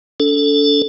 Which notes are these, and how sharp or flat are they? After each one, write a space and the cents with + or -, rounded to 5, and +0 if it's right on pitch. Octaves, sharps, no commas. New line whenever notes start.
D4 -45 A4 +0